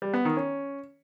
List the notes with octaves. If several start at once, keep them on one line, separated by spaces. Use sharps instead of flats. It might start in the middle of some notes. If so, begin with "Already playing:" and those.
G3
B3
D#3
C#4